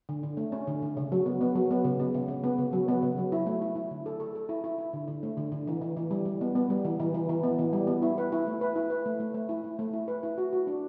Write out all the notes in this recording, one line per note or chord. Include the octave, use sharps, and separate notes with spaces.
D3
D3
A3
C#4
D3
D3
C#3
F#3
B3
B3
F#3
B3
C#3
B3
C#3
C#3
B3
C#3
F#3
B3
C#3
F#3
E4
A3
E4
E4
D3
A4
A4
A4
E4
E4
E4
D3
D3
A3
D3
D3
E3
E3
E3
G3
G3
B3
B3
G3
E3
E3
E3
E3
B3
E3
G3
B3
E4
B4
E4
A3
B4
E4
B4
A3
A3
A3
E4
E4
A3
E4
B4
E4
F#4
F#4
D4